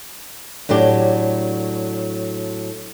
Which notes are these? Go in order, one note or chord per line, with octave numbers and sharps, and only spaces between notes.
A2 F#3 D4 G4